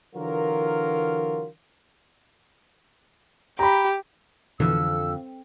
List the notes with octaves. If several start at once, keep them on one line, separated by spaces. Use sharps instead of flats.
D3 E3 F#3 F4 A#4
G4 A#5 B5
F2 B2 D3 E3 E6